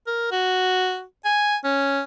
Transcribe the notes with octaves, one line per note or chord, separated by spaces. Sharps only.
A#4
F#4
G#5
C#4